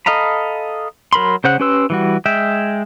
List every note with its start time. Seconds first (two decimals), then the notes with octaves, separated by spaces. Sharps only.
0.06 A4 D#5 F5 A#5 B5
1.13 F#3 A#4 B5 C6
1.44 C#3 C5 F#5 F#6
1.60 C#4 G4 B4 C6 E6
1.90 E3 G3 F#4
2.26 G#3 E5 G5